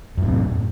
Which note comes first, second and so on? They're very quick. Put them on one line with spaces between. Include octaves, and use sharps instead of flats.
F#2 A2 C3